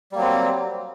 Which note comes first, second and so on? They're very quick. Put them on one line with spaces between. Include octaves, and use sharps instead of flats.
G3 A#3 F#3 C4